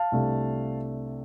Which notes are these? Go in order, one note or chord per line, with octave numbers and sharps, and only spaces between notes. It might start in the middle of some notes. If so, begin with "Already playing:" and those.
Already playing: F5 A5
C2 C3 A3 D4